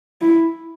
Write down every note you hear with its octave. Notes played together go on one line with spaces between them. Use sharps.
E4